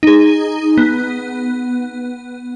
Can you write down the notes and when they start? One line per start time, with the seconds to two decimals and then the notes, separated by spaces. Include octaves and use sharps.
0.03 D#4 G#4
0.78 B3